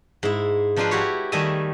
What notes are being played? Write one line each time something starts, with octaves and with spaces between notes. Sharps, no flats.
G#2 E4
F3 D4 D#4 F4 B4 C5
E4 F#4 G4 C#5
D#3 G3 A3 D#5 E5 G#5